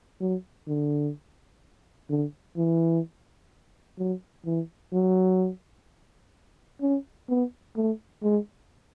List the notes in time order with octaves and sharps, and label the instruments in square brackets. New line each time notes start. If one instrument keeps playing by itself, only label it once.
[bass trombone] F#3
D3
D3
E3
F#3
E3
F#3
C#4
B3
A3
G#3